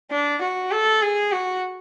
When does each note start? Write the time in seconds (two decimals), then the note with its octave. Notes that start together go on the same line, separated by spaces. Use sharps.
0.11 D4
0.42 F#4
0.71 A4
1.02 G#4
1.32 F#4